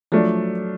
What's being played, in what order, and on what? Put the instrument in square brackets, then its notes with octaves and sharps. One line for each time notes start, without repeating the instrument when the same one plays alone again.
[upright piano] F3 A3 D4 [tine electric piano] F#3